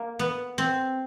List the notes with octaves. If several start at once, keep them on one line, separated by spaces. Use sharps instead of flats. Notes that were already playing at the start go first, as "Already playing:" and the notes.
Already playing: A#3
B3
C4